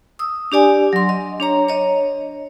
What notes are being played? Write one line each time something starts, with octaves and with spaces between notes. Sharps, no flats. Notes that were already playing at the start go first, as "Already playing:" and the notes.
D#6 E6
D4 G4 D5 G#5
F#3 C6
D#5
D4 C#5 A#5
C#5 D#5